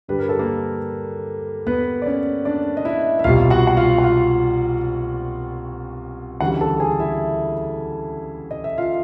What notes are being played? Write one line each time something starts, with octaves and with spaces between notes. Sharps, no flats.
G2 D3 G3 B4
A#4
A4
A#3 A#4
B3 B4
D5
C#4 C#5
D4 D5
D#5
E4 E5
E5
C2 B2 G3 F4 F5
F#4 F#5
F#5
F4 F5
F#5
F4 F5
D2 C#3 E3 G3 F#4 F#5
A4 A5
G#4 G#5
E4 E5
D#5
E5
F4 F5